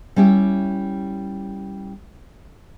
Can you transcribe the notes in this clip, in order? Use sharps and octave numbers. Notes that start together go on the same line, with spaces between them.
G3 C#4 E4 G4